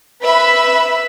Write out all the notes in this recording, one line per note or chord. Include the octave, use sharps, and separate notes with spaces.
B4 E5 B5